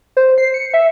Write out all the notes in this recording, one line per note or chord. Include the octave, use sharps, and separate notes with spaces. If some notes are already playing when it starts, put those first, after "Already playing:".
C5
C7
C#7
E5